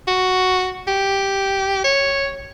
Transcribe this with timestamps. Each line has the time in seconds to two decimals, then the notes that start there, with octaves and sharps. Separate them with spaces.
0.07 F#4
0.88 G4
1.84 C#5